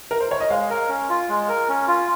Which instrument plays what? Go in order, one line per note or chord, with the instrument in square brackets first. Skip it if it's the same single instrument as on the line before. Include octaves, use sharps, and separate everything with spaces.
[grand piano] A#4
C5
C#5
D#5
[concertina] G#3 [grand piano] F5
[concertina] A#4
C#4
F4
G#3
A#4
C#4
F4